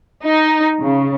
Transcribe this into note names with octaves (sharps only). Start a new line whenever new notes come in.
D#4
C#3